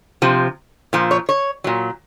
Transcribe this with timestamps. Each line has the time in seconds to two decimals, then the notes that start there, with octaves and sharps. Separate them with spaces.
0.22 C3 F3
0.93 A#2 F3
1.11 C#5
1.29 C#5
1.64 A#2 F#3